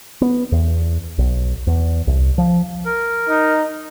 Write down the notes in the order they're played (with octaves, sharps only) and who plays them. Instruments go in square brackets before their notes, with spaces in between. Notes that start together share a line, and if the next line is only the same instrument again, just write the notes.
[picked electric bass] B3
E2
B1
E2
C2
F3
[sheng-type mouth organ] A#4
[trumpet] D#4